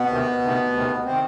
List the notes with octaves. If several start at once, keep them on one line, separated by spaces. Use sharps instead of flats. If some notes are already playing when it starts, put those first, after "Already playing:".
Already playing: B2 B3
D2 C3 D#3
D2 C3 D#3
D2 C3 D#3
C3 D#3 C4